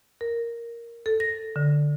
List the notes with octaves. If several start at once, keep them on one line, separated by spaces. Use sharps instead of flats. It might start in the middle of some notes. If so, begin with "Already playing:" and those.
A#4
A4
A#6
D3